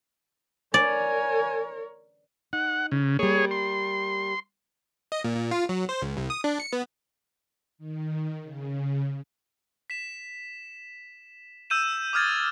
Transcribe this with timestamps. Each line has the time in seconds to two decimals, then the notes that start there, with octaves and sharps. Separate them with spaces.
0.74 A#4 C#5 D5 G#5
2.53 D#4 F#5
2.92 C#3
3.19 G3 A#3 G#4 C#5
3.51 C6
5.12 D#5
5.24 A#2
5.36 A#2
5.51 F4
5.69 F#3
5.89 C5
6.02 C#2
6.17 C2
6.30 D#6
6.44 D4
6.60 C#7
6.73 B3
7.78 D#3
8.43 C#3
9.90 B6 E7
11.70 E6 G6 D#7 E7
12.13 D6 D#6 F6 G#6 A6